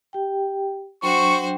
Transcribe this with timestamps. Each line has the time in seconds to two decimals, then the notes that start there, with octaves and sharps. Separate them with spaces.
0.13 G4 G5
1.03 F#3 D4 F#4 C5 G5 C#6